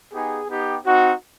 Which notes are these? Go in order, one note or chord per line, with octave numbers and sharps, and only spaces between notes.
B3 D#4 G4 G#4
B3 D#4 G4
C4 D#4 F#4